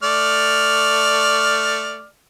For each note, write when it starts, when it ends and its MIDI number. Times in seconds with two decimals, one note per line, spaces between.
0.03 2.06 57
0.03 2.06 74
0.03 2.06 89